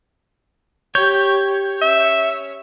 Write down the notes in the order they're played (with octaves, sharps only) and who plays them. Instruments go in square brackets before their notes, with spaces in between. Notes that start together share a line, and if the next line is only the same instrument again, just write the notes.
[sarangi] G4 [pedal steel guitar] C#5 [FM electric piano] G6
[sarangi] C#4 [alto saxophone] E5